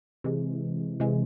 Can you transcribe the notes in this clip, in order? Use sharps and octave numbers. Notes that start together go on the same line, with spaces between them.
C3 E3 G#3
C3 E3 G#3